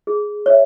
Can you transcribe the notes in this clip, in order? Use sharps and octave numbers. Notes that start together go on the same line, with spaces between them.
G#4
C#5 E5